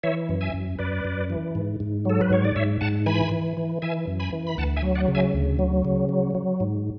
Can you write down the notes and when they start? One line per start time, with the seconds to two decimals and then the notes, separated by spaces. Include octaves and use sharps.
0.03 E3 C#5 E5
0.29 F#2
0.41 E5 G#5
0.54 F#2
0.79 F#2 B4 D5
1.05 F#2
1.30 E3
1.55 G#2
1.80 G#2
2.05 F#3 A4
2.21 B4
2.30 G#2 C#5
2.44 D5
2.56 G#2 C#5 E5
2.81 G#2 F#5 A5
3.06 E3 G#5 B5
3.32 E3
3.57 E3
3.82 E3 E5 G#5
4.07 F#2
4.20 G#5 B5
4.33 E3
4.47 B5
4.58 D2 F#5 A5
4.76 E5 G#5
4.83 F#3
4.95 D5 F#5
5.08 C#3
5.15 E5 G#5
5.34 D2
5.59 F#3
5.85 C#3
6.09 F#3
6.35 F#3
6.60 G#2